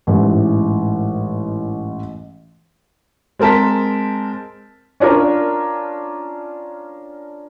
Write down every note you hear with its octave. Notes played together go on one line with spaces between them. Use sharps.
A1 G#2 E3
G#3 C4 A#4 A5 B6
C#4 D4 F4 A#4